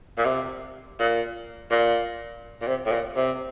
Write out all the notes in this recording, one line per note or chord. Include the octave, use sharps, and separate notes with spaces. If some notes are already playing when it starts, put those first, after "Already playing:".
A#2
C3
A#2
A#2
A#2
C3
A2
A#2
C3